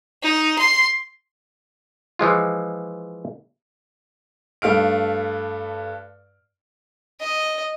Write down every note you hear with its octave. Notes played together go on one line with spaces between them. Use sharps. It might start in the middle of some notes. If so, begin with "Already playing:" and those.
D#4
C6
E3 F3 G#3 F4
G2 A3 F5 F6 D7
D#5